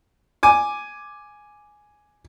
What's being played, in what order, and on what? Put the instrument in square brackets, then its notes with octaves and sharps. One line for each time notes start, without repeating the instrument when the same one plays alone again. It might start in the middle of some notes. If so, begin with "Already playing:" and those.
[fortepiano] G#5 D6